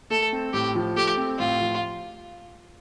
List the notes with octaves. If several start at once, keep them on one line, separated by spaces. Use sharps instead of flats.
A3 A4
C4
A2 G4
F3
A3 G4
C4
A2 F4
F3